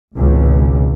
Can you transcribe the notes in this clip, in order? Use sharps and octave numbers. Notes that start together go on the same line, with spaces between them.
G#1 C#2 B2